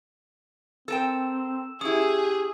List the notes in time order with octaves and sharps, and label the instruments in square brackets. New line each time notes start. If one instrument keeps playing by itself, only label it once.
[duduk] C4 [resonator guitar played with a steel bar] A4 A#4 G5 [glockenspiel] E6 E7
[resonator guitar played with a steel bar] C#4 E4 [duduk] G4 [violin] G#4 [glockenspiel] D#6